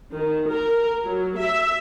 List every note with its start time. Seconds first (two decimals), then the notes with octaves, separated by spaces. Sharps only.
0.13 D#3
0.49 A#4
1.03 F#3
1.36 E5